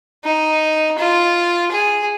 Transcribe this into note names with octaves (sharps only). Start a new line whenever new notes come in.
D#4
F4
G#4